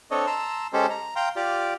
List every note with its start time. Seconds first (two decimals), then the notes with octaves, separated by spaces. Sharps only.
0.11 C4 D4 A4 C#5 D#5
0.27 A5 A#5 C6 E6
0.73 G#3 C#4 G4 A4 C5
0.90 A#5
1.16 F5 G5 A#5 C6
1.36 F4 G4 D5